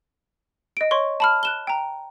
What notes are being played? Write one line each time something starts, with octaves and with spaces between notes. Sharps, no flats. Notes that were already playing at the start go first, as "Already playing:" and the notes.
D#5 D7
C#5 C6 C#6
A5 B5 F6
F#6 E7 G7
G5 A#5